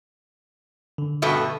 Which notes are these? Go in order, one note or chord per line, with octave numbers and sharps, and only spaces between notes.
D3
G2 B2 A3